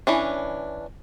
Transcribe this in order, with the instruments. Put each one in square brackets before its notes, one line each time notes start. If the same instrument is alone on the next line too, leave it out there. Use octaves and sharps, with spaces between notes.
[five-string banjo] E3 C#4 D4